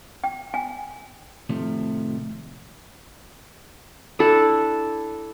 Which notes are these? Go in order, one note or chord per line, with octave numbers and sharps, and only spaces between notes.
G5
G#5
A2 C3 D#3 F3 A3
D4 E4 A4